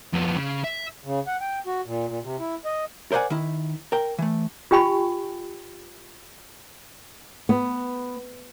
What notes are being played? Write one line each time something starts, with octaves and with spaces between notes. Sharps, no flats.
F2 B3
C#3
E5
C#3
F#5
G5
F#4
A#2
A#2
C3
E4
D#5
A#4 C5 D5 D#5 F#5 G#5
D#3 E4
A#4 G5
E3 A3
F4 G4 G5 G#5 B5 C#6
B3